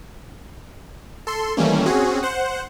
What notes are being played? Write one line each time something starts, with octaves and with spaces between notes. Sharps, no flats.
A4 C6
D#3 E3 G3 A3 A#3 C#4
C4 C#4 F#4 G#4
C5 F#5